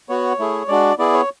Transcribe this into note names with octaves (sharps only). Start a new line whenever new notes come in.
B3 F#4 C#5
A3 E4 G#4
G#3 D4 F#4 D5
B3 E4 G#4 D5
C#5